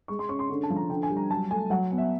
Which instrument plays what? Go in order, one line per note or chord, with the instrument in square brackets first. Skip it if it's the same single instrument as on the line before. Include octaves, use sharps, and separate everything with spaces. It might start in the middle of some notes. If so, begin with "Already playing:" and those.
[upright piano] G#3 C#6
C6
C#4 C#6
C6
D3
A5
F3
A#5
D3 G5
G#5
G3
A#5
F#3 A5
A3 G#5
F#3 F#5
B3
E5